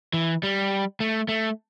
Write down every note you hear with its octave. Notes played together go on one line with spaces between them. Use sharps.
E3
G3
A3
A3